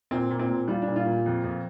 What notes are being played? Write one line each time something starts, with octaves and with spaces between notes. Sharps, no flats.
A#2 C4
A#2
C4
A#2
G3 F4
D4
A#2
F4
A#2
F2
F2